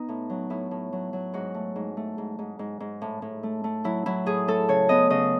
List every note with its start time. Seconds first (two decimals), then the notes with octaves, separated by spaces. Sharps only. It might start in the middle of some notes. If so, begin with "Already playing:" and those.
Already playing: B3 D#4
0.09 A2
0.30 F#3
0.50 A2 E4
0.71 A2
0.93 F#3
1.13 F#3
1.33 G#2 F#4
1.55 A3
1.76 G#2
1.97 A3
2.18 G#2
2.39 G#2
2.59 G#2
2.80 G#2
3.02 A2
3.22 A2
3.43 A3
3.64 A3
3.84 F#3 E4
4.06 F#3 E4
4.26 A2 G#4
4.48 A3 A4
4.68 C#3 C#5
4.89 B3 D#5
5.10 C#3 D#5